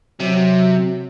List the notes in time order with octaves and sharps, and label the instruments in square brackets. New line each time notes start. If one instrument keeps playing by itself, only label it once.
[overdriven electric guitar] C3 [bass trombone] F#3